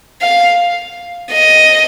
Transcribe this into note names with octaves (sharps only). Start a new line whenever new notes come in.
F5
D#5